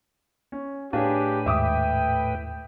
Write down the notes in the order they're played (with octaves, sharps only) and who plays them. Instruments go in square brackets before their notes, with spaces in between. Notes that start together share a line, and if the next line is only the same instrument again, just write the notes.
[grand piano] C#4
[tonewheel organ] A2 B4 [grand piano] D4 G#4 C#5 [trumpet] G4 [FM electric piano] F5
[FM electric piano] D#2 G#2 [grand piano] E5 D6 D#6 [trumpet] G5